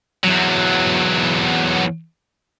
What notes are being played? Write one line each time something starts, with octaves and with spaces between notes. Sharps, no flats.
E2 F#3